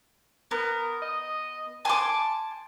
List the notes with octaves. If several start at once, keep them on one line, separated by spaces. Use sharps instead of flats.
B3 A#4
D#5
G#5 A5 C6 D6